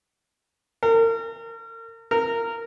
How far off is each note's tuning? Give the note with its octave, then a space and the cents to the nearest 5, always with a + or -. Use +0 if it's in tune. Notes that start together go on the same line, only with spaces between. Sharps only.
A#4 -35
A#4 -15